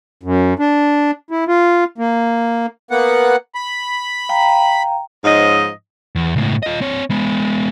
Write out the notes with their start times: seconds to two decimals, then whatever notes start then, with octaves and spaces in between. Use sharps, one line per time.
0.23 F#2
0.59 D4
1.31 E4
1.48 F4
1.98 A#3
2.91 A#3 B3 F#5
3.55 B5
4.29 F5 G5 A#5
5.25 G#2 F3 C#4 D#4 D#5
6.15 E2
6.36 C#2 A2
6.63 F4 D#5
6.81 C4 C#5
7.10 G#3 B3